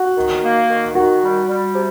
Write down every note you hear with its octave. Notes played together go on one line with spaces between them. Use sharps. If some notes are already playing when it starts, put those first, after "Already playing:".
Already playing: F#4
D#3
A#3
D#3
D#3 F#4
G3
G3
C3